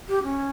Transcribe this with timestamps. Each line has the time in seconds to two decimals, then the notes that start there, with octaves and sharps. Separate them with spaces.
0.08 G4
0.23 C#4